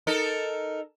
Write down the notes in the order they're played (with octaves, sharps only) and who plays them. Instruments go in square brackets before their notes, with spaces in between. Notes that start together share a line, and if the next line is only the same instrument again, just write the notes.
[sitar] D#4 A4 A#4